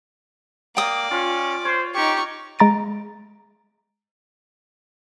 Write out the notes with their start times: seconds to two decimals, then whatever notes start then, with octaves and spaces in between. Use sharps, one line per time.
0.77 A#3 D5 G5 D#6
1.11 C#4 F4
1.65 C5 C#5
1.95 D#4 G4 C#6
2.59 G#3 A#5 A6 D7